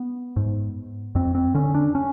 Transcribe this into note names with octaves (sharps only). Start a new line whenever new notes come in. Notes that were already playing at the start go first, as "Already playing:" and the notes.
Already playing: B3
G#2
F2 C4
C4
D3 C#4
D4
C#4